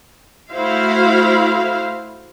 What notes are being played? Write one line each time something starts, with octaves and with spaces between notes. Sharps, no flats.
A3 E4 F#4 C5 F5